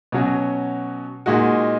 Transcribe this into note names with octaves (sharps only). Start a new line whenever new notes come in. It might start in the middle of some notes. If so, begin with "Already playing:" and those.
B2 F#3 C#4 F#4
A#2 G#3 D#4 F#4